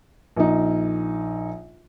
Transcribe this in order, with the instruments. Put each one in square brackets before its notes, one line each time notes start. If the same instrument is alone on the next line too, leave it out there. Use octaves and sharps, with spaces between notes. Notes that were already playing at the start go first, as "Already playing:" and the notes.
[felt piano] A#1 D#4